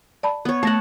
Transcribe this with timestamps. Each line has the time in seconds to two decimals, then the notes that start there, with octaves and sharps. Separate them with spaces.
0.23 D5 A5 B5
0.45 B3 C#5
0.63 A3 F#5 A5 A#6